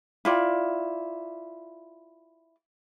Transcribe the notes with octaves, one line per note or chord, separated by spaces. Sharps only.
E4 F4 D5